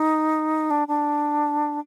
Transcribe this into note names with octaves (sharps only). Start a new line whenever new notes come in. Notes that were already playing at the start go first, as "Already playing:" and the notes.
Already playing: D#4
D4
D4